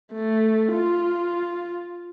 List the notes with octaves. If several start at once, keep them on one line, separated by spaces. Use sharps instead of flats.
A3
F4